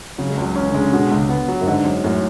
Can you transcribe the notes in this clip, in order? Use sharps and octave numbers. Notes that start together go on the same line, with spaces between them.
C#3 F#3
G#3
C#2 F#3
E3 C#4
D3
C#3 G#3
C#3
B2 D3
C#2
B3
F#3
F#2
G#2 D3
F#2
F#2 A2